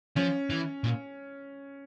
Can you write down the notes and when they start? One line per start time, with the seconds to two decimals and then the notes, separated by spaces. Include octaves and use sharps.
0.16 F3 C#4
0.50 E3
0.84 A#2